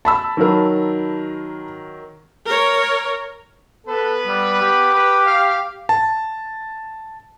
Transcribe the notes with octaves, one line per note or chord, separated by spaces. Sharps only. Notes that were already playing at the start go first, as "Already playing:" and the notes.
A5 B5 E6
D#3 F#3 A#4
A#4 C#5
B3 A4 B4
G3
G4
B4
F5
A5